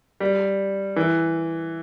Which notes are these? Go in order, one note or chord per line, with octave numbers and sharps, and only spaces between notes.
G3
E3